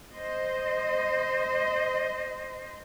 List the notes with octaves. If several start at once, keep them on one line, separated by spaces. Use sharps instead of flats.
C5 D#5